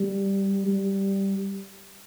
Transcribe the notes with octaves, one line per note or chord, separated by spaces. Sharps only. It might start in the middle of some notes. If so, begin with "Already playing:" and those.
Already playing: G3
G3